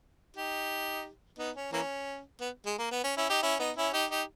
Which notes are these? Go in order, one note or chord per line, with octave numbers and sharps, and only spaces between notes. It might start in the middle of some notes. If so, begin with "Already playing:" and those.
D#4 G4
B3 D#4
C#4
E3 A#3 C#4
B3
G#3
A#3
B3
C#4
C#4 E4
D#4 G4
C#4 E4
B3 D#4
C#4 E4
D#4 G4
D#4 G4